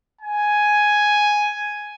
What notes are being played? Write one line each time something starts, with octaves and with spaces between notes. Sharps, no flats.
G#5